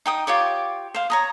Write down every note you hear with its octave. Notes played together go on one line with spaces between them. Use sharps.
D#4 G5 D#6
F4 G4 C#5 D6
C5 F5
C#5 A#5 D#6